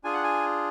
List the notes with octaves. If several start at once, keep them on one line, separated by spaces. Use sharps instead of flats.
D4 F4 G#4 G#5
F#5
G#5